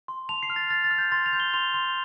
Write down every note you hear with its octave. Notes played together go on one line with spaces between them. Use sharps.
C6
A5 F7
C7
F6
A6
F6 A6
A6
F6
G6
C6 A6
F7
G6
G7
C6 F7
C6